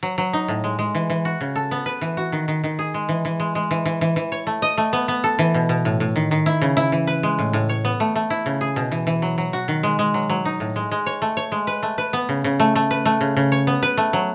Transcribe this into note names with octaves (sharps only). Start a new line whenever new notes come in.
F#3
F#3
D#4
A2
G#3
G#3
E3
E3
F#4
C#3
A4
B3
B4
E3
F#4
D#3
D#3
D#3
G#4
G#3
E3
E3
G#3
G#3
E3
E3
E3
E3
C#5
A3
D#5
A3
B3
B3
A4
E3
B2
B2
A2
A2
D#3
D#3
E4
C#3
E4
E3
B4
G#3
A2
A2
C#5
B3
A3
A3
E4
C#3
G#4
B2
E3
E3
F#3
F#3
F#4
D#3
G#3
G#3
F#3
F#3
D#4
A2
G#3
G#3
C#5
A3
C#5
G#3
B4
A3
B4
B3
C#3
C#3
A3
A3
B4
A3
C#3
C#3
C#5
B3
B4
A3
F#3